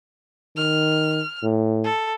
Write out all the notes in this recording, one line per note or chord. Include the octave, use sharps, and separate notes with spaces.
D#3 F6
A2
A4